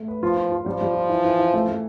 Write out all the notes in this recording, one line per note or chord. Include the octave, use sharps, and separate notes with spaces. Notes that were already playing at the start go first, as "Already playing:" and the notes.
Already playing: A3
B4
F3 F4
F4
F4
F3 G3
G3
F4
E3
E3
E3
A3
A3